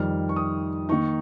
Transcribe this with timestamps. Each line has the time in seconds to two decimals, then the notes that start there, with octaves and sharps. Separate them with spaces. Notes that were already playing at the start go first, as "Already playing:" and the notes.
Already playing: F2 D#3 G3 F6
0.29 C#6
0.36 D#6
0.89 D#3 A#3 D#4 C#6